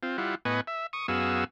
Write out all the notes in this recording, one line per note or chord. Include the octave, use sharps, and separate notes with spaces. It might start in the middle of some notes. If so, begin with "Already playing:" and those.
C4 F4
G3 E4 F4 F#5
A2 B3 B4 D#5 G#5 C#6
E5
C#6 D#6
F#2 B3 F#4 G#4 F5 E6